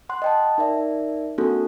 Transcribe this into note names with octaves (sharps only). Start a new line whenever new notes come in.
F#5 C6 F#6
D#5 G5 A5
D#4 A#4 D5 E5
A#3 C4 D4 F#4 A4